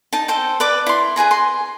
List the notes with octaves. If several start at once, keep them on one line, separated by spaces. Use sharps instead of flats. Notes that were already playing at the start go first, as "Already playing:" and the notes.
D#4 A5
A4 C5 G5
B4 D5 D6
E4 C6
G#4 B4 G#5 A#5
C6